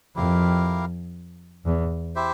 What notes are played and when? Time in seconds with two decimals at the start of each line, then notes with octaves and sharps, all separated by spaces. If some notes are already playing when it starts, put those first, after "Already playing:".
0.15 F2 E4 G4 A#4 F5
1.65 E2
2.16 E4 G4 C5 E5